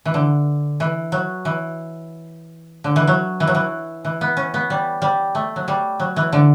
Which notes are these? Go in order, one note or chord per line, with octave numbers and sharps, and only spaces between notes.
E3
D3
E3
F#3
E3
D3
E3
F#3
E3
F#3
E3
E3
B3
C#4
B3
G3
G3
A3
F#3
G3
F#3
E3
D3